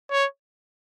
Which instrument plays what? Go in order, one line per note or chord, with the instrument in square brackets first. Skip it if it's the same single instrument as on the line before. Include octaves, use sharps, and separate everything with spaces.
[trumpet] C#5